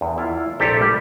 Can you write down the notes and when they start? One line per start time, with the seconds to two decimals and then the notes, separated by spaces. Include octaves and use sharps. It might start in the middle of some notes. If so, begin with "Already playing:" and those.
0.01 E2
0.18 E4 F4
0.60 A#1 C3 G4 A4
0.82 G3